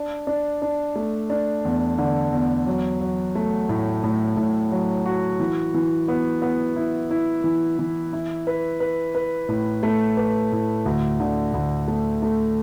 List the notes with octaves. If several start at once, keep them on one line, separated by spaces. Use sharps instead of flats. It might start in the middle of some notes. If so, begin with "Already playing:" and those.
Already playing: D4
D4
D4
A3
D4
E2
D3
E2
F#3
F#3
A3
A2
A2
A2
F#3
F#4
E3
E3
B3
B3
E4
E4
E3
E3
E4
B4
B4
B4
A2
A3
B4
A2
D2
D3
D2
A3
A3